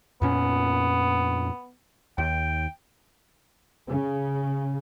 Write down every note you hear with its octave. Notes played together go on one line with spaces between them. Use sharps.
F2 A#2 B3 C#4
D#2 G5
C#3